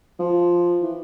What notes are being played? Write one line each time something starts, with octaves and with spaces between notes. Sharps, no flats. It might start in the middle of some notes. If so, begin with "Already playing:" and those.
F3
E3